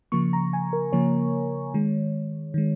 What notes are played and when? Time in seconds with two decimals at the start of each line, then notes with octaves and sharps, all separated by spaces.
0.12 C#3 F3 A#3 C#6
0.33 A#5
0.53 G#5
0.73 A#4
0.92 C#3 F3 A#3 C#5
1.74 D#3 G#3
2.54 D#3 G#3